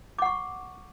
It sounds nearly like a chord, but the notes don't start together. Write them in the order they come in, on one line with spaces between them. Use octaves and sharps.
D6 F#5 C#6